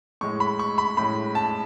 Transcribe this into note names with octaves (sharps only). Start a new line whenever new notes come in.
A2 G#3 C#6
B5
C#6
B5
A2 G#3 B5
A5